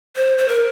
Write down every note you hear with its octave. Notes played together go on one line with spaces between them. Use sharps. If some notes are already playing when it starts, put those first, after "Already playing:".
C5
C5
A#4